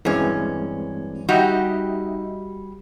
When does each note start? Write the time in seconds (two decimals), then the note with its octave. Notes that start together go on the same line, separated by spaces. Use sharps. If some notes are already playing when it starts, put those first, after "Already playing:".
0.05 G2 E3 G#3 C4 C#4
1.29 G3 D#4 F#4 G4 D#5 E5